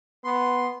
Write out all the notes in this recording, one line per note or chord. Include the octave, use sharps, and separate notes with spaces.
B3 C6